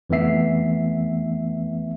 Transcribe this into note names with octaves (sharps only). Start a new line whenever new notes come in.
F2 E3 A3 B3 E5 C7